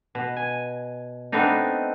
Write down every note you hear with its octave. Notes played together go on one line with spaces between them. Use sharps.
B2
G#5
A3 B3 C4 D4 D#4